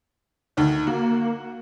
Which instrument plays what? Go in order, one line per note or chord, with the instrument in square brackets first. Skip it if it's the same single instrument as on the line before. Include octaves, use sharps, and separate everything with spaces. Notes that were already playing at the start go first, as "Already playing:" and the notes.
[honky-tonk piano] D2 D#3
[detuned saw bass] A#3 [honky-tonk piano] F#4